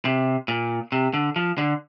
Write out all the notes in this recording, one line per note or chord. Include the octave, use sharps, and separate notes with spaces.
C3
A#2
C3
D3
F3
D3